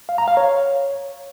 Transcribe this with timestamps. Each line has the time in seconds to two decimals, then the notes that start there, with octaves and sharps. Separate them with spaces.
0.09 F5
0.18 A#5
0.28 F5
0.37 C#5